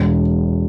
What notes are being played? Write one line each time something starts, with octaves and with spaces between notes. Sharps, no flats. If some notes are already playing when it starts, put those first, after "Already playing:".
Already playing: E1